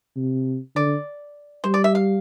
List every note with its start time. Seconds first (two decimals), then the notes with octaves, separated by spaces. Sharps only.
0.16 C3
0.76 D3 D5
1.64 G3 C5
1.74 D5
1.84 E5
1.95 F5